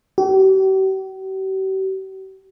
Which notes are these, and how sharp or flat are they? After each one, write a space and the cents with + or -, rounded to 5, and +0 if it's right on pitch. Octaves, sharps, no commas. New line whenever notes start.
G4 -45